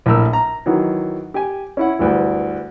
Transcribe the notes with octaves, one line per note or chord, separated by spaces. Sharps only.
A#1 A2 A#4 E6
A#5
D#3 E3 F#3
G4 G#5
C#4 E4 F#5
D2 G2 E3